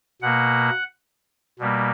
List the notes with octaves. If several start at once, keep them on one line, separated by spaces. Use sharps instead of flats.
B2 A#3 F#5
B2 G3 A#3